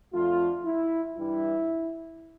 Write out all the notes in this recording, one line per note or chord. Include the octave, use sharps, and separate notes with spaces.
F2 D3 A3 F4
E4
G2 E3 G3 E4